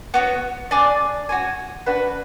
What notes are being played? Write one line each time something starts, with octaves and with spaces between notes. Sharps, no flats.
B3 F#4 C#5
D4 G#4 D5
F#4 C#5 G#5
D4 F#4 B4